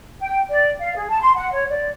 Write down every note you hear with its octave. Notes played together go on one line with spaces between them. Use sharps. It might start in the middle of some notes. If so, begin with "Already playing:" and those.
G5
D5
F5
G#4
A5
C6
F#5
C#5
D5